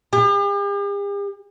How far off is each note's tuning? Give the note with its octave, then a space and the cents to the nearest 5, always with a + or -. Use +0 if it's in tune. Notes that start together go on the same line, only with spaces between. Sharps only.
G4 +45